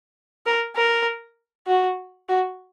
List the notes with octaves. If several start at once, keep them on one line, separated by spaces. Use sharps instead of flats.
A#4
A#4
F#4
F#4